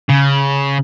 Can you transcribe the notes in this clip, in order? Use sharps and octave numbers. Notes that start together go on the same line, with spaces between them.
C#3